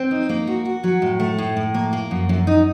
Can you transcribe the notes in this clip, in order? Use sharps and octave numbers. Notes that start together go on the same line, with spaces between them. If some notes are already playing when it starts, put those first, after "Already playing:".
Already playing: C4
D#4
A#3
F#4
F#4
F#3
A2
A3
A2
A2
A#3
A#3
F#2
F#2
D#4